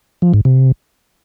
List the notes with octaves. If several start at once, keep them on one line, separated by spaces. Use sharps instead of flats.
F3
G#2
C3